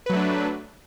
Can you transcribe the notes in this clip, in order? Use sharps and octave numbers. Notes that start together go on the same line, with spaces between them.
F#3 A3 D4 B4